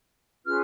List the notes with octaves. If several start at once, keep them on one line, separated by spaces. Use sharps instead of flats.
C#4 F4 G#4 B4 F6